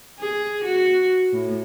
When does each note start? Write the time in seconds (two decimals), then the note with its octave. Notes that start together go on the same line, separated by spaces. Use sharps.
0.20 G#4
0.64 F#4
1.34 A2